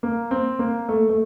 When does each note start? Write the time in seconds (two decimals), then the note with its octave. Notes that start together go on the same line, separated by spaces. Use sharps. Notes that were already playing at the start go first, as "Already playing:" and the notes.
0.03 A#3
0.31 C4
0.59 A#3
0.89 A3
1.09 A3